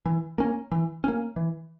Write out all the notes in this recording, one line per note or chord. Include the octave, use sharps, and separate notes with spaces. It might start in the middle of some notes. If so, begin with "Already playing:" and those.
E3
A#3 C#4
E3
A#3 C#4
E3